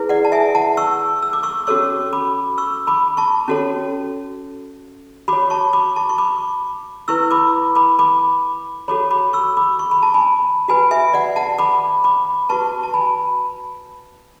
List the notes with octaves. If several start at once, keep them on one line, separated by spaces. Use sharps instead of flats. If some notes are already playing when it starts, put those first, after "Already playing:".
Already playing: E4 G#4 B4
D5 F#5
A5
E5 G#5
F#5 A5
C#6 E6
E6
D6
C#6 E6
C#4 F#4 A4 C#5 C#6 E6
B5 D6
C#6 E6
B5 D6
A5 C#6
C#4 F#4 A4 C#5
F#4 C#5 B5 D6
A5 C#6
B5 D6
A5 C#6
C#6
B5 D6
E4 B4 C#6 E6
B5 D6
B5 D6
B5 D6
F#4 A4 C#5 B5 D6
B5 D6
C#6 E6
B5 D6
C#6
B5
A5
G#5 B5
F#4 B4 G#5 B5
E5 G#5
D5 F#5
F#5 A5
B5 D6
B5 D6
F#4 B4 A5 C#6
A5
G#5 B5